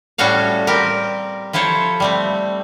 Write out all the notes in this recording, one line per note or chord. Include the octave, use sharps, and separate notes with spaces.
A2 G3 C#4 F#4 A4 F5
G3 C4 G4 A#4
F3 E4 A4 C5 C#5
G3 A3 C4